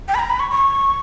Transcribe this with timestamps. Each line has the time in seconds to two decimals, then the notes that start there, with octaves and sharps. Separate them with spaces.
0.08 G5
0.15 B5
0.19 A#5
0.30 B5
0.40 C#6
0.50 C#6